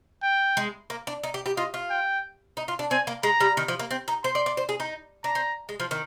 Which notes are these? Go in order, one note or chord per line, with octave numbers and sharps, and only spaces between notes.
G5
G#3
A#3
D4
D#4
G4
G4
F4 D#5
F4
G5
D#4
F4
D4
C4 G#5
A#3
G#3 A#5
G3
D#3
F3
A#3
C4
D#4
C5 C6
D5
D5
C5
G#4
D#4
D4 A#5
C4
G#3
F3
D#3